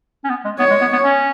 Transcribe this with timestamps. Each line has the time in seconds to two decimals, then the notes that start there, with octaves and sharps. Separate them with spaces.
0.24 C#4
0.29 B3
0.45 G#3
0.59 B3 C#5
0.70 G#3
0.81 B3
0.92 B3
1.04 C#4